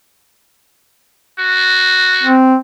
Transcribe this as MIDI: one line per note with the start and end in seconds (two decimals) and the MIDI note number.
1.39 2.37 66
2.23 2.56 60